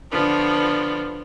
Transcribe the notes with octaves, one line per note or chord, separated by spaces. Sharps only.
D3 F3 B3 D4